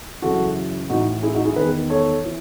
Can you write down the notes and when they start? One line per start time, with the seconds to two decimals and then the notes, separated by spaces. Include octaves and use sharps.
0.22 F#2 C#3 E3 F#4 A4
0.90 A2 E3 D#4 F#4
1.23 E4 G#4
1.34 D#4 F#4
1.45 E4 G#4
1.56 E2 D#3 G#4 B4
1.90 A4 C#5
2.25 E3